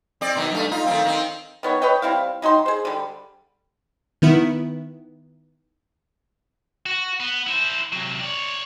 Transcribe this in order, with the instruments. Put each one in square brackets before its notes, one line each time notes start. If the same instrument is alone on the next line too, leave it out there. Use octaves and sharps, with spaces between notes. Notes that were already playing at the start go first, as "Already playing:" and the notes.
[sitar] C4 D5
B2 D#3
G2 A3
D#4 F4
D#3 A3 C4
D#3 C4
[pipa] D#3 B3 C#5
B4 C#5 D#5 G5
G3 C4 E4 F5
F#3 D#4 G5 C6
G#4 C5
D3 G3
[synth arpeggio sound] D#3 B3 E4
[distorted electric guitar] F#4
B3
E4 C5
C3 F#3
C#5 D5